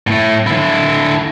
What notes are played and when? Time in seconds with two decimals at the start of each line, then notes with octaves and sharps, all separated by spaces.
0.07 A2 A3
0.47 D3 E4